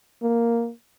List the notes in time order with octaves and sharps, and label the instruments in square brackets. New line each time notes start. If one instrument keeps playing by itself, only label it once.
[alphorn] A#3